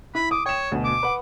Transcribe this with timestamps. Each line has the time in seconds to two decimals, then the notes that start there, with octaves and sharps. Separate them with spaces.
0.15 E4 B5
0.31 D6 D#6
0.46 C#5 G5 E7
0.72 D2 B2
0.84 D6
1.03 B4 F#5